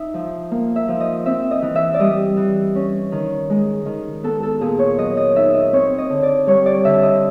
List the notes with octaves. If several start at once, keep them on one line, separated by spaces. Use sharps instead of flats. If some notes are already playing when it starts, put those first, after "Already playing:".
Already playing: D#4 E5
F3
A#3
E5
F3
D#5
C4 E5
D#5
E3
E5
D5
G3 D#5
E3
C#4
D#3
G#3
D#3
B3 A4
A4
A#2 G#4
C#5
F#3 D#5
D#5
D#4 E5
D#5
C4 C#5
D#5
D3
D5
G3 C#5
D5
D3 E5
D#5